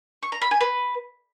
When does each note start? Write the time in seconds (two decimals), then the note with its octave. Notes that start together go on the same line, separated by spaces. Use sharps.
0.23 C#6
0.32 A#5
0.42 B5
0.51 G#5
0.61 B4